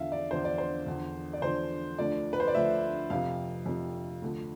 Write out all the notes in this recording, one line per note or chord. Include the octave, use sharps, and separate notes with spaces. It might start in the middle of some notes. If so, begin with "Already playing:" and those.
Already playing: E2 D3 F3 E5 F5
D5
E2 D3 F3 C5
D5
C5
E2 D3 F3
D5
E2 D3 F3 C5
D2 D3 F3 D5
B4
C5
D5
D2 D3 F3 E5
F2 C3 F3 F5
F2 C3 F3
D2 D3 F3